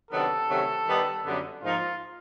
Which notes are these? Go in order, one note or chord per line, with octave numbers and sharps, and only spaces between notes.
C3 D#3 F#3 B3 D4 A4
C3 D#3 F#3 A3 C#4
D#3 G3 B3 D#4
F#2 D3 G3 B3
G#2 F3 A#3 D#4 F4